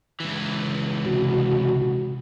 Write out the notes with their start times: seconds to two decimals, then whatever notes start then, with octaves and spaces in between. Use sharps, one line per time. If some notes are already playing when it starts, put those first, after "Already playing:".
0.20 C#2 E3
1.06 C3 F#4